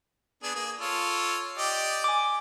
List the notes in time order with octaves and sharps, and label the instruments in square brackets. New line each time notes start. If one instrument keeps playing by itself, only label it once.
[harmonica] B3 D4 G#4
A#3 G#4
F4 A4 C#5
G4 D5 D#5
[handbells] G#5 D6